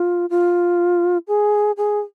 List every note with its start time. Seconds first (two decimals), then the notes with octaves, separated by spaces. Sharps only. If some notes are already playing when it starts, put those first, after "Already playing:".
Already playing: F4
0.30 F4
1.28 G#4
1.77 G#4